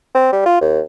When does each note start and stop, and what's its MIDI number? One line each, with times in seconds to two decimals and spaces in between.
0.15 0.28 60
0.32 0.44 55
0.46 0.60 65
0.61 0.81 39